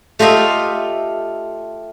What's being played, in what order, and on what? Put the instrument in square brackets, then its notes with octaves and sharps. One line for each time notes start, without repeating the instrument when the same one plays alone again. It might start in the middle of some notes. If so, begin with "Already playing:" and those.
[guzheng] A3 F4 G4 D#5 E5